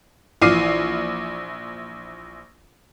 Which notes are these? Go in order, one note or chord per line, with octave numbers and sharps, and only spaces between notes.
A#1 E3 D6 F6 C7 D#7